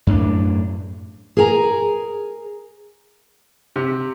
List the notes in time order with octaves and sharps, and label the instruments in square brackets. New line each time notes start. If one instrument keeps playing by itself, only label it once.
[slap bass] F#2 A2 C4 D4
[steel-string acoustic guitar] G#4 A#4 G#5 A#5
[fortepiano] C3